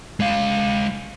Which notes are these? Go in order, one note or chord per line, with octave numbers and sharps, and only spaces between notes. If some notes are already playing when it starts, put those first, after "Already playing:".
G#3 F5